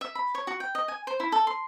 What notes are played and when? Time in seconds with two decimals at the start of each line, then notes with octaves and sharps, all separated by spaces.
0.01 E5
0.15 B5
0.35 C#5
0.47 F#4
0.60 G5
0.75 D#5
0.88 G#5
1.07 C5
1.20 E4
1.32 A4
1.47 C6